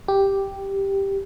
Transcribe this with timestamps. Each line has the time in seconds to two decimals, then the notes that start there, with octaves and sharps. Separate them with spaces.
0.08 G4